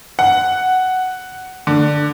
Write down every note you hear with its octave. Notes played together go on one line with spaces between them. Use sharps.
F#5
D3